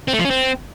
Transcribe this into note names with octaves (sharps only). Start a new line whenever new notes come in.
C4
A3
F3
C#4
C4